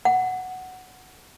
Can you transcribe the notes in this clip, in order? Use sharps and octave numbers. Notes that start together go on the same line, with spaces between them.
F#5